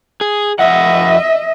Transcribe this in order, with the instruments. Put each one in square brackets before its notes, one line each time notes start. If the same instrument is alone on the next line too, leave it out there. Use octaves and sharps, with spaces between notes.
[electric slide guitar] G#4
[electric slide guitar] F2 F#5 [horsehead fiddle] D#5 E5